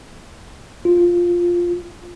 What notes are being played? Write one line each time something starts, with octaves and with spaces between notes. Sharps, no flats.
F4